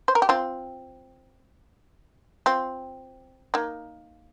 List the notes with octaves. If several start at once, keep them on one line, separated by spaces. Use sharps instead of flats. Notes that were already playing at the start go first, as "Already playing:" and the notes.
C5
A#4
G4
C4 F4
C4 F4
A#3 D#4